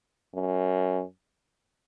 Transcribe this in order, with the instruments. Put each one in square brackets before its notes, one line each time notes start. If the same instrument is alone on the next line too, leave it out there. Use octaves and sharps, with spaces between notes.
[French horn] F#2